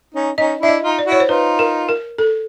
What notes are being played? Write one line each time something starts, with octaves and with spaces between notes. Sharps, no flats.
C#4 D#4
C#4 D#4 D#5
D4 E4 E5
D#5
D#4 F4
D5
E4 F#4
C#5
C5
D#4 F4 B4
A#4
A#4
A4